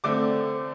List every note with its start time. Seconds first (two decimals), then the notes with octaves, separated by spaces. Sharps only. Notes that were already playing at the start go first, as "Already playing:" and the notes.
0.04 D3 A3 C4 D5 D6